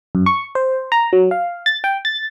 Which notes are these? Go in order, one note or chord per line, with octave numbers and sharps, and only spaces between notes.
F#2
C#6
C5
A#5
F#3
F5
A6
G5
A6